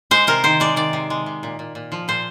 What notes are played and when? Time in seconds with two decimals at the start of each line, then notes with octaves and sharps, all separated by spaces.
0.11 G#3 C5
0.27 C3 A#4
0.44 D#3 C5
0.60 G#3 D5
0.76 D#3 D5
0.93 C3
1.10 G#3
1.26 C3
1.43 A#2
1.59 A#2
1.75 A#2
1.92 F3
2.08 A#2 C5